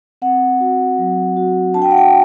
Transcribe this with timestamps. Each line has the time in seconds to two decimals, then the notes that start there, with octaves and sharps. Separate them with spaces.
0.22 C4 F#5
0.60 F#4
0.98 F#3
1.37 F#4
1.74 D4 A5
1.82 G5
1.91 F#5
1.98 G5